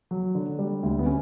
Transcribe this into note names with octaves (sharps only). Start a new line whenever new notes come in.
F#3
D3
G3
D2
B3
C#4